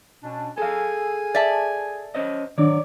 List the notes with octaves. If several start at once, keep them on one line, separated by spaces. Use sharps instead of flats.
B2 C#4 D4
G#4 A4 F5 G#5
D5 E5 A5
C#4 C5 D#5
G#2 D3 D#3 F#3 D4 C#5 D5